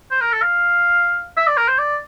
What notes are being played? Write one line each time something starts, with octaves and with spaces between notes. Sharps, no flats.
C5
A#4
A4
F5
E5
D5
A#4
C5
D5